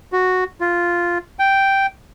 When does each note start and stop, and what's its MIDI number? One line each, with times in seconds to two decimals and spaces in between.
0.12 0.44 66
0.60 1.18 65
1.39 1.86 79